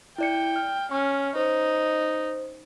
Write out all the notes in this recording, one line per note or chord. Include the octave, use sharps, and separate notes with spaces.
E4 D5 G5 C#7
F6
C#4 C#6 F6
D#4 C5